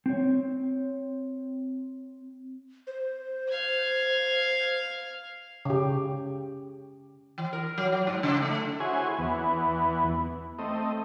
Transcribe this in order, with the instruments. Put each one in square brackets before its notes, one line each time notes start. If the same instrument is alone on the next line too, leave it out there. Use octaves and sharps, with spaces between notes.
[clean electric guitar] C4 C#5
[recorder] C5
[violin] F5 G#6
[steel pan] C#3 G4
[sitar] E3
A#4
F#3
F#3
G#2
C#3
A3
[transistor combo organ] E4 F#4 G#4 C5 C#5 G#5
E2 E3 B3
A3 C4 D#5